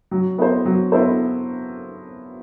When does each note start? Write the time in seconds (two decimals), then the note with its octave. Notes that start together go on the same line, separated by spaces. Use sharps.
0.11 F#3
0.38 B3 E4 A4 C5
0.65 F#3
0.92 B3 E4 A4 C5